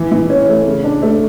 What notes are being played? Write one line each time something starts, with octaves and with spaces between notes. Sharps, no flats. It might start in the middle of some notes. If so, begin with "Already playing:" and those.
Already playing: E3
E3
C#4
A3
C#3
D4
A3